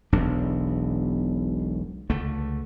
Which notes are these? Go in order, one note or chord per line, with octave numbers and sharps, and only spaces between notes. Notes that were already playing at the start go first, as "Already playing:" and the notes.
E1 B1 E2 D4
C#2 D3 A3